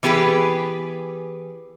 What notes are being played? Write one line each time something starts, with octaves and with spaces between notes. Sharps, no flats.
E3 B3 G4 G#4 B4